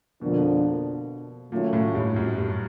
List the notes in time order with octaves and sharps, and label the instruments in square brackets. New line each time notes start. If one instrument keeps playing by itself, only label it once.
[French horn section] F2 D3 F3 A#3 D4 [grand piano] B2
[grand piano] A#2 [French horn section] D#3 F#3 A3 C#4 F4
[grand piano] A2
G2
F#2
G2